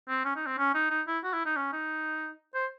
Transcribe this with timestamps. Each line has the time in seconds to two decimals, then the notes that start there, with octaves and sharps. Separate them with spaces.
0.09 C4
0.25 C#4
0.36 D#4
0.46 C4
0.58 C#4
0.74 D#4
0.90 D#4
1.07 E4
1.24 F#4
1.34 E4
1.45 D#4
1.56 C#4
1.72 D#4
2.54 C5